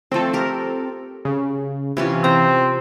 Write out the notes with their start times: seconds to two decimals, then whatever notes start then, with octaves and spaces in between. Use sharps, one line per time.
0.11 F3 A3 C4 A4
0.33 G4 A#4
1.25 C#3
1.97 C3 E3 C#4 F4
2.24 C4 A#5